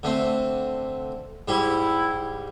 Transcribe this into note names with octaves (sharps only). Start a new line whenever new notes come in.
D3 A3 C4
G#2 G3 E4 G4